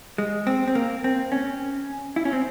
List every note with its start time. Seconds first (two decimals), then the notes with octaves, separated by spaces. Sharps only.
0.18 G#3
0.47 C4
0.68 C4
0.75 A#3
1.04 C4
1.32 C#4
2.16 E4
2.25 C#4
2.33 C4